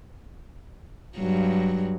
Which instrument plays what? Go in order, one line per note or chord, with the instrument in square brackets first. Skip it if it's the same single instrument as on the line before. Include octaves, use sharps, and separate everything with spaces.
[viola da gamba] G2 F#3